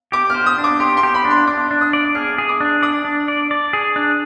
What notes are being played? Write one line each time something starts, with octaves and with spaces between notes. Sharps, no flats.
G4 D6
C5 F6
D#6
D4
D6
G4 C6
C6
G4
B5
D4
C6
D4 D6
D4
D#6
D5
G#4 F6
G#4
D6
D4
D5 D#6
D4
D5
D5
G#4
D4